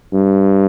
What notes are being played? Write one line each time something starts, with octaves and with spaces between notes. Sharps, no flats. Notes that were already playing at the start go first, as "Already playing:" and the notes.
G2